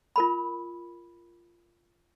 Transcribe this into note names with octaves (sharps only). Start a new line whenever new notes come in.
F4 A#4 B5